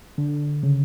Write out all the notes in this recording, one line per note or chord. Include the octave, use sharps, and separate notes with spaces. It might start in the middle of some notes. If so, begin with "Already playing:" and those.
D3
C#3